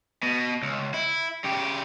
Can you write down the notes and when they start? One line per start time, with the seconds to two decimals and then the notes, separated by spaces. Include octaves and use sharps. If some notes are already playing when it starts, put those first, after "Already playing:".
0.23 B2
0.62 C#2
0.94 E4
1.44 C#3 G4